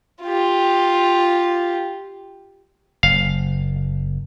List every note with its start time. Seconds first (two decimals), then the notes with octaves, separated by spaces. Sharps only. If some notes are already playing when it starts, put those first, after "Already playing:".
0.22 F4 G4
3.03 F#1 F5